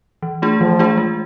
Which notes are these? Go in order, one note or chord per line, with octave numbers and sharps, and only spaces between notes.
E3
A3 D4 F4 G#4
E3 F3
A3 D4 F4 G#4
G#3